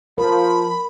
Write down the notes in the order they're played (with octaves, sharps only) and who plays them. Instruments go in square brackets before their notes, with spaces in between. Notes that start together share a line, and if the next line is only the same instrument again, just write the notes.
[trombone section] F3 [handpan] A#4 [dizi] B5